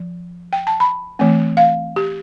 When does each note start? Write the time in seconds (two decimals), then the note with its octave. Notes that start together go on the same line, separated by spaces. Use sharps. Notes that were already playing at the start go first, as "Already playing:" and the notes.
Already playing: F3
0.53 G5
0.67 A5
0.80 B5
1.19 E3 A3 C4
1.57 F5
1.96 G4